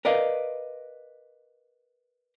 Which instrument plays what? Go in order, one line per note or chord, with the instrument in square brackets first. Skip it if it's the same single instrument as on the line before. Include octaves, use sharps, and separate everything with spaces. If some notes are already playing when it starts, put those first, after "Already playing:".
[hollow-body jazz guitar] A#4 B4 D5 D#5 F5